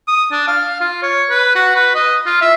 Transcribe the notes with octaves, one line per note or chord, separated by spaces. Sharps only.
D#6
D4
F5
F4
C#5
B4
F#4
B4
D#5
F4
E5